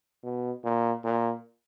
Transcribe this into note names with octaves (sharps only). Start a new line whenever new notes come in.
B2
A#2
A#2